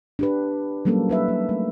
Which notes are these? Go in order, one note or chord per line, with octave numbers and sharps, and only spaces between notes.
D4 G4 B4
F#3 G3 A#3 C#4 A4
D#4 B4 E5
A#3
A3